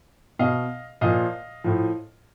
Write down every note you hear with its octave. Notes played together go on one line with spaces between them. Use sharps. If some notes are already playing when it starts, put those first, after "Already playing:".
B2 D#5 F5
A#2 F3 D#5 F5
A2 F3